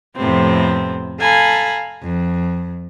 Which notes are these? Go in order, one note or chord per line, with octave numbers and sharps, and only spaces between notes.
F2 A2 C3 B3 C4
A4 F5 G#5 A#5 B5
F2